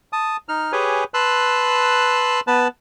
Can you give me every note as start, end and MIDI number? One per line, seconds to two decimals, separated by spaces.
0.13 0.37 81
0.13 0.37 87
0.49 0.72 63
0.49 0.72 89
0.72 1.04 67
0.72 1.04 68
0.72 1.04 71
0.72 1.04 73
0.72 1.04 80
1.14 2.40 71
1.14 2.40 81
1.14 2.40 84
1.14 2.40 88
1.14 2.40 90
2.47 2.68 59
2.47 2.68 71
2.47 2.68 81